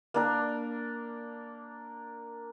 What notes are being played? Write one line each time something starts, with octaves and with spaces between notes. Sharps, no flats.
A#3 D4 A#4